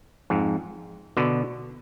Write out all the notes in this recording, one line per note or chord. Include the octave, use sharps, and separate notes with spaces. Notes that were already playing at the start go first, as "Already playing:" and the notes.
F2 G#2
B2 D3